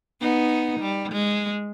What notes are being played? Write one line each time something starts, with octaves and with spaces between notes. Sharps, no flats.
B3 D#4
G3
G#3